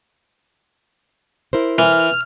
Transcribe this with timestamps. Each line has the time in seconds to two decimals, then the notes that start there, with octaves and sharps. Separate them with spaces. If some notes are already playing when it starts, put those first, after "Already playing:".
1.53 E4 A#4 C5
1.78 E3 F6